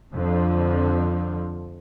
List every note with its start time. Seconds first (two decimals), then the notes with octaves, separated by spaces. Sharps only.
0.13 F2 D3 F3